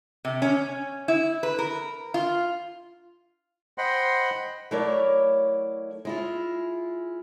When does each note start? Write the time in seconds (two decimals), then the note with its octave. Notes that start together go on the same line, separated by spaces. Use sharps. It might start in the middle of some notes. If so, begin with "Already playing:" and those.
0.25 C3
0.42 C#4
1.08 E4
1.43 B4
1.59 A#4
2.14 F4
3.78 C5 D#5 F#5 G5 B5 C6
4.71 F#3 A3 E4 A#4 C#5 D5
6.05 G#3 E4 F4